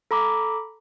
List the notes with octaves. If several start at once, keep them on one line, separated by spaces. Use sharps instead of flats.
A4 A#5 B5 D6